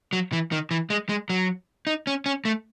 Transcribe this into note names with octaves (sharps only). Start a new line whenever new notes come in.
F#3
E3
D#3
E3
G#3
G#3
F#3
D#4
C#4
C#4
A3